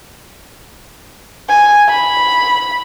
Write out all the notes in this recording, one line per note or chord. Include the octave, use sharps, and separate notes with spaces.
G#5
B5